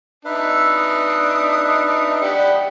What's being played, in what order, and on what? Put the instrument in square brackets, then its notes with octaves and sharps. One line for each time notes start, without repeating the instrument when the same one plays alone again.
[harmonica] D4 D#4 [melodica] B4 E5
[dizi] E6
D#6
[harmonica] G4 F#5 B5 [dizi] D5